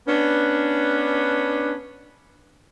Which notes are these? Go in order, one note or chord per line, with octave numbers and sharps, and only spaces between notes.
B3 C#4 D4